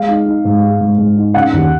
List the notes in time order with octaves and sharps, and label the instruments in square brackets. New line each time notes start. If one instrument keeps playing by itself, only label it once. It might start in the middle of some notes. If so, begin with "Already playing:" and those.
Already playing: [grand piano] G#3 [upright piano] F5
[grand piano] D#4
D#4
G#2
G#3
G#2
G#2
D#4
[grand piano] C#3 [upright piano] F#5
[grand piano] D#2